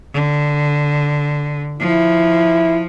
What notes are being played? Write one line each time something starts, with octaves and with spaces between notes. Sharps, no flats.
D3
F3 E4